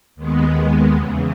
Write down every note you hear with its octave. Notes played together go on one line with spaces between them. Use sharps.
D#2 D#3 G#3 B3
E2 C#3 E3